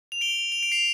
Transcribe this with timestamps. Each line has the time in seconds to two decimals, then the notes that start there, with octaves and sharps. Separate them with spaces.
0.12 F7
0.21 D7 G7
0.52 F7
0.63 D7
0.72 C7 F7